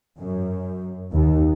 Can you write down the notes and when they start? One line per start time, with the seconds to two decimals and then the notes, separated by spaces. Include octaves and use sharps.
0.18 F#2
1.13 D#2